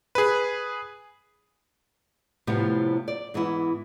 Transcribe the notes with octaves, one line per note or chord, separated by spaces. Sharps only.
G#4 B4
A2 C3 F3 G3 B3
D5
G#2 E3 B3 E4